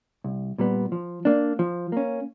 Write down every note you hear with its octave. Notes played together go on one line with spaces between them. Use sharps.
C2
A#2 G3 B3
F3
A#3 D4
F3
A#3 C#4